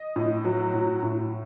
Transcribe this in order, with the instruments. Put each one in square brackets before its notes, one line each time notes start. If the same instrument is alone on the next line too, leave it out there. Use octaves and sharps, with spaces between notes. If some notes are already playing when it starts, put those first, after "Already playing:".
Already playing: [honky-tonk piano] D#5
A2
F#3
A2
A2